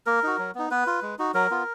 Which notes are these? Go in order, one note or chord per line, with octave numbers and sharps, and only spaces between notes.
A#3 A#4
D#4 F#4
F#3
B3 D#4
B3 B4
F4
G#3
D#4 F#4
F#3 A#4
B3 F4